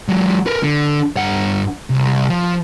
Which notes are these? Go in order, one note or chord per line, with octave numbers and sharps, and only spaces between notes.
F#3 G#3
A#4 B4
D3
G2 F#5
C2
F3